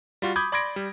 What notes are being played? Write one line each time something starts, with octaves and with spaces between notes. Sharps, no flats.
G3 F4 F#4
B5 D6 D#6 G6 G#6
D5 B5 C6 G#6 A#6 D7
G3